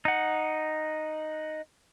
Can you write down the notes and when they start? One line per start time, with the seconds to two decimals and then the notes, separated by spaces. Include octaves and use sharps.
0.05 D#4 F#5